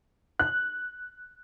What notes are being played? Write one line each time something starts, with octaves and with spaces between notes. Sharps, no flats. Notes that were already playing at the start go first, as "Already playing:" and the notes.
F#6